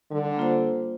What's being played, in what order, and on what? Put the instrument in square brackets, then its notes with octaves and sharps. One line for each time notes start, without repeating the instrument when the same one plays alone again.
[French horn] D3 [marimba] G3
[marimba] A#3 F4 C5